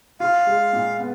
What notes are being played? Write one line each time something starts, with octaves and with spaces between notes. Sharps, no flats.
F4 F5
G#3
A#2
B3